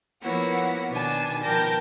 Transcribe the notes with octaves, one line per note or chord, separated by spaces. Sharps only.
F3 A#3 B3 E4 F#4 C#5
B2 D#3 D4 G#5 A5
B2 F3 A#4 G5 A5 A#6